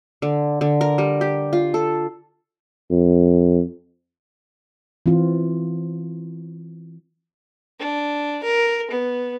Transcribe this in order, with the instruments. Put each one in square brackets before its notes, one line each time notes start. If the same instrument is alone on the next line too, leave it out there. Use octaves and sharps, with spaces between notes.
[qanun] D3
D3
A#4
G3
G4
F4
A4
[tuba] F2
[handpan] E3 C4 F4
[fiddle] D4
A#4
B3